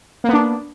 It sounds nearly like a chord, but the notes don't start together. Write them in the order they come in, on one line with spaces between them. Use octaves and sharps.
A#3 B3 D4